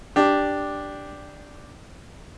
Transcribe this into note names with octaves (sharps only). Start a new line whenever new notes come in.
D4 G4